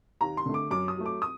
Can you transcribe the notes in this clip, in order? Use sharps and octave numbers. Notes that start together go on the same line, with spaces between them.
D#2 A#5
C6
D3 A3
D6
F#2 D6
D#6
F#3 A3
D6
D#6